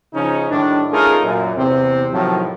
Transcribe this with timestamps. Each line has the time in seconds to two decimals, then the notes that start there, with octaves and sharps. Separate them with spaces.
0.14 C#3 F3 C#4 D#4
0.50 A2 D#3 G3 D4
0.92 A3 C#4 D#4 F4 G#4 A#4
1.24 F#2 A#2
1.57 E2 C3 C4
2.13 A2 C3 D#3 F3 F#3